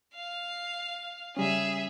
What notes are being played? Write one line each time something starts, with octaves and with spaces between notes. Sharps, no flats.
F5
C#3 G3 C#4 G#4 E5